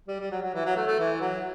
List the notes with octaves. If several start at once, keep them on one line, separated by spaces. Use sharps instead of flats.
G3
G3
F#3
F#3
E3
F#3
A3
A3
E3
F#3